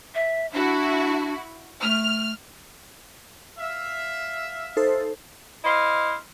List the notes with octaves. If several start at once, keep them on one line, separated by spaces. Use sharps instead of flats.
E5
D4 E4 F#4
A3 F6
E5 F5
D#4 A4 C5
E4 C5 D#5 F5